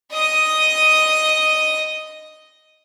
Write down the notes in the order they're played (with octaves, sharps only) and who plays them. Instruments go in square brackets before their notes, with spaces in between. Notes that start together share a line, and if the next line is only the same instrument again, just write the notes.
[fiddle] D#5 D#6